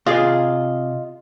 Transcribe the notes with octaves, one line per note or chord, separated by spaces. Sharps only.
C3 F4 G#4 D#5 F5